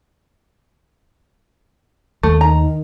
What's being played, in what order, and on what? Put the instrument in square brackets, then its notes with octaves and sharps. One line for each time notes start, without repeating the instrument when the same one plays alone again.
[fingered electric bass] D#2 [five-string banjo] A3
[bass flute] D#3 [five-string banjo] A#5